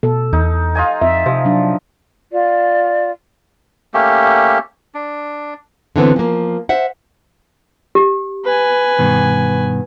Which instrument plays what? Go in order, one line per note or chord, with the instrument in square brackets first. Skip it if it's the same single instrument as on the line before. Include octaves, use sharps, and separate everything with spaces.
[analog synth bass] B2 [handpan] A4
[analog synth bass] E2 [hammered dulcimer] D#4
[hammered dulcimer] F4 D#5 G#5
[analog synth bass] F2 [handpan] E5
[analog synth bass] C3 [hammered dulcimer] F3
[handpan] F#3 D4
[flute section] F4 D5
[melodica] A3 A#3 C#4 G4
D4
[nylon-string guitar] D3 E3 B3 C4
F3 A#3
C5 E5 F#5
[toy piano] G4
[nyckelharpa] B4 G#5
[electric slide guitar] G2 B2 D#3